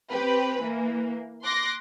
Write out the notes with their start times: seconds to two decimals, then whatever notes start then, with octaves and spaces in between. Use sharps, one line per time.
0.11 C4 G4 B4
0.60 E3 A#3
1.44 C6 D6 F#6 A#6